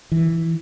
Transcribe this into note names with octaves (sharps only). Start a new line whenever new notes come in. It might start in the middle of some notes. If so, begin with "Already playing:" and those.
E3